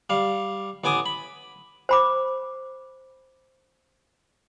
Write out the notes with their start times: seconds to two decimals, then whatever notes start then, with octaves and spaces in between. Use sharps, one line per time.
0.10 G3 F5
0.84 A1 B3 G#5 D6 D#6
1.06 B5
1.89 C5 B5 D6